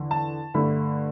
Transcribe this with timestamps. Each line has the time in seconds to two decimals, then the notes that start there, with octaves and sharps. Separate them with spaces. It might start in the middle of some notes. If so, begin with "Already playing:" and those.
Already playing: E2 D3
0.11 A5
0.54 G2 D3 A3 B5